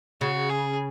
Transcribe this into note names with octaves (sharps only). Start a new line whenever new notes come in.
C#3 F#4
G#4